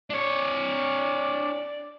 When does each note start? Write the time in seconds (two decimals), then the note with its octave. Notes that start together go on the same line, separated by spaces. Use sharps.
0.10 D4 C#5 D5